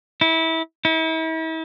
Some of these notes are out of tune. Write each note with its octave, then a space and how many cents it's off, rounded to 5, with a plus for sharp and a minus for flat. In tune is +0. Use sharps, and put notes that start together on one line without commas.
E4 -25
E4 -40